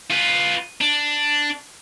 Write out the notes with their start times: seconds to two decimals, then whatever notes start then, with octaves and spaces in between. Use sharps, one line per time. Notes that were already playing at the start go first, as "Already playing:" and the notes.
0.11 F4 B4
0.81 D4